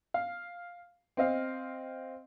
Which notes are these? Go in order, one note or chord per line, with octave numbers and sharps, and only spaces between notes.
F5
C4 D#5 F5